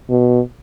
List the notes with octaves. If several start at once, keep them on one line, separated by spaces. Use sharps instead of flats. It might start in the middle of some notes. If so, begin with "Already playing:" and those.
B2